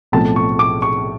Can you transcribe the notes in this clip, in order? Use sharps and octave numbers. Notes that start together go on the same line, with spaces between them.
B1 A2 F3 A3 C4 A5
C#6
D6
C#6